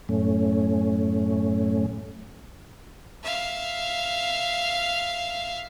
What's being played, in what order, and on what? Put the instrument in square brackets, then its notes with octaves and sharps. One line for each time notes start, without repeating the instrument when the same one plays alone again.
[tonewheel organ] F#2 A2 A3 C#4
[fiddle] E5 F5